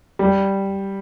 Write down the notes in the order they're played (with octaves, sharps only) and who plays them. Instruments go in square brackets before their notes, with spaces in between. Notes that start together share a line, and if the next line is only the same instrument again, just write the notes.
[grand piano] G3